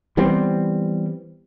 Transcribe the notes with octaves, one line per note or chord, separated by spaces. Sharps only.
E3 G3 B3 C4